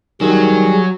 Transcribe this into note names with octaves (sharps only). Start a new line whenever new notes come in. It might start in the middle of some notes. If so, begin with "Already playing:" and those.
D#3 F#3 G3 G#4